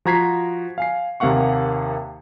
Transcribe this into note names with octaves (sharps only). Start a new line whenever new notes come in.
F3 F#4 A#5 G#6 B6 C7
F5 G#5 C7
D#2 C3 A#3 F5 F#5 C#6